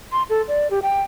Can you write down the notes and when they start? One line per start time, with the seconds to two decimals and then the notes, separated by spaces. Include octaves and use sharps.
0.12 C6
0.30 A4
0.48 D5
0.71 G4
0.83 G5